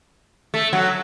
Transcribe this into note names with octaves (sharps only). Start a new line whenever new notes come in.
A3
F#3